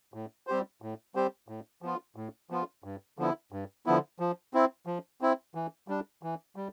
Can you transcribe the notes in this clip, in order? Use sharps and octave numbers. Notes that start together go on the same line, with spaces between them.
A2
G3 C4 G4 C5
A2
G3 C4 G4 C5
A2
F3 B3 F4
A2
F3 B3 F4
G2
D3 F3 B3 E4
G2
D3 F3 B3 E4
F3
C4 E4
F3
C4 E4
E3
G3 D4
E3
G3